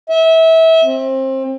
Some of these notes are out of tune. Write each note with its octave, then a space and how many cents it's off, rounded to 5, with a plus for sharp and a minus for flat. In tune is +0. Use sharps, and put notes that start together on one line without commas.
E5 -25
C4 +25